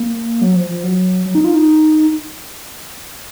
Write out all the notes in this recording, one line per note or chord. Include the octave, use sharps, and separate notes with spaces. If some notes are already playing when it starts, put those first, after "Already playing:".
Already playing: A#3
F#3
F3
F3
F#3
F#3
D#4
F4
D#4